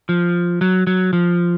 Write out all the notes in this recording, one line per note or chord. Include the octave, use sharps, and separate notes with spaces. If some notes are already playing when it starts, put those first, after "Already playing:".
F3
F#3
F#3
F3